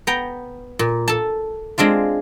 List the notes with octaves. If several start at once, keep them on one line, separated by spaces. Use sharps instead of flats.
B3 G5 A#5
A#2
A4 A5
G#3 C4 D4 F4